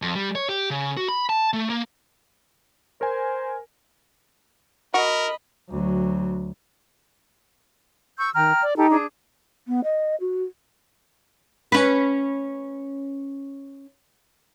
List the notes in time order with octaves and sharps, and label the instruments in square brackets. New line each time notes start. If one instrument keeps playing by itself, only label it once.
[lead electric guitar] F2
G3
C#5
G4
C#3
F#4
B5
A5
A3
A#3
[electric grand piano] A#4 G#5 [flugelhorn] C5
[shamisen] F#4 [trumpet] A#4 [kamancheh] D#5 B5
[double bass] D2 F#3
[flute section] C#6 E6 G6
[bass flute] D#3 [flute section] G5 A#5 F6
[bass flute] D5
[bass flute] D#4 [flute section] G4 A4
[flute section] D4 G#4
[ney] B3
D#5
F#4
[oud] C#4 B4